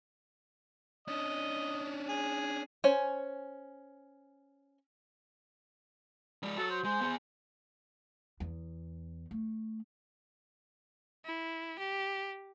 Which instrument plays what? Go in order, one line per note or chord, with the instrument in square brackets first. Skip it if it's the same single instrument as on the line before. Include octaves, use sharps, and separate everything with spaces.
[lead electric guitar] C#4 D4 [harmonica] D#5
[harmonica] G#4
[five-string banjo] C#4 C5 C#5 G#5
[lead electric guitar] G#3 D5
[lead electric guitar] F#4 C#5 [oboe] A4
[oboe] C5
[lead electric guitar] G#3 [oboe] C5
[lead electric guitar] B3 G#4
[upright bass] E2
A3
[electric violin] E4
G4